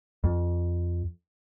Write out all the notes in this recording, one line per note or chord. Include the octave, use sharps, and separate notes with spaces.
F2